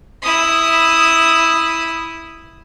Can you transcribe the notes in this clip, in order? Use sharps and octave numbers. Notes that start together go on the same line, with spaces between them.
E4 D#6